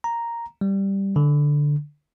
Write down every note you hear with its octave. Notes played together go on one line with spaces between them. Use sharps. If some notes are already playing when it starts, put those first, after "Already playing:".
A#5
G3
D3